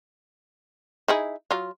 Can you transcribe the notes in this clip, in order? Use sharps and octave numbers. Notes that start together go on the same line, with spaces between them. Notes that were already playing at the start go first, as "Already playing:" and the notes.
D#4 E4 G#4
F#3 F4